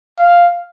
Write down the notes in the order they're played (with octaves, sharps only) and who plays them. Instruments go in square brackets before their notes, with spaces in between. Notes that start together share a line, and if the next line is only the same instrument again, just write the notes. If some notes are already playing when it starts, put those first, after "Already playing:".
[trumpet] F5